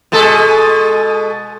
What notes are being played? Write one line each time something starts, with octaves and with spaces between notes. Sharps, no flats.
B2 G#3 A4